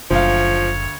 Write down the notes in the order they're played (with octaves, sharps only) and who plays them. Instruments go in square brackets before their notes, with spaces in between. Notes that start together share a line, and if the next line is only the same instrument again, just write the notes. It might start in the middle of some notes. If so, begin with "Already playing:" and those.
[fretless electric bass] F#1 [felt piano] D2 F5 [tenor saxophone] F3 [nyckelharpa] C#5